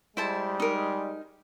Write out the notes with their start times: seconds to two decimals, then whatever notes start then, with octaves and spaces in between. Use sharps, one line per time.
0.17 G3 G#3 E4 C5 A5
0.60 D#4 A#4